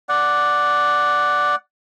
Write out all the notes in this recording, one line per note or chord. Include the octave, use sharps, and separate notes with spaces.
D5 F#5